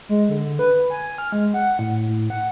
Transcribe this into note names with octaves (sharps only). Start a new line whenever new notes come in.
G#3
D3
B4
G#5
F6
G#3
F#5
A2
A2
F#5